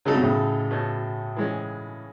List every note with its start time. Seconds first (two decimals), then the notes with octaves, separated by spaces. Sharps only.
0.05 C#3 F#3 A3 D#4 A4
0.14 B2
0.21 A2 C#3
0.71 B2 A3 C#4
1.36 E3 G#3 C#4